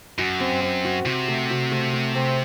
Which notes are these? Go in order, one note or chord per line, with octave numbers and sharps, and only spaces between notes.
F#2 F#4
C4
C4
F#4
C3 F#4
A3
F#4
A3
A3
C4